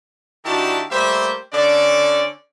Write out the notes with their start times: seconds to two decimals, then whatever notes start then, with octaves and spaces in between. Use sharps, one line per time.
0.45 D#3 D4 E4 F#4 G4 A5
0.91 G3 A3 A#3 C5 E5
1.53 D3 C#4 A4 D5